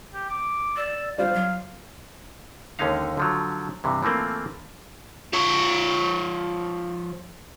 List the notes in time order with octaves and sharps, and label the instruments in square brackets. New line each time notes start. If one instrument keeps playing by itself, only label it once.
[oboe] G4
D6
[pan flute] D5 [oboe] E6
[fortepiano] G3 F4 D5 [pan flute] C5 [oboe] F5
[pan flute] F#3
[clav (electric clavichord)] D#2 D3 G#3 C#4 D#4 F5
D3 F3 F#3
G2 C3 E3
E3 F3 A3 A#3 C4
[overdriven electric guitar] F3 C#5